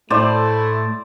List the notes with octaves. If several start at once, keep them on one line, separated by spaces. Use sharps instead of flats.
A2 A3 E4 C5 D5